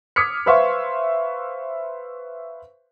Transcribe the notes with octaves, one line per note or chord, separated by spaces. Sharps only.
D6 D#6 F6 G#6 B6 C#7
B4 C5 E5 F5 C6 C#6